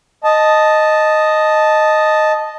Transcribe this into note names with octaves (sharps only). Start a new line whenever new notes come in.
D#5 A5